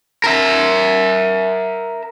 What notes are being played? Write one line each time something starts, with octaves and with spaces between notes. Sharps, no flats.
A#4 E5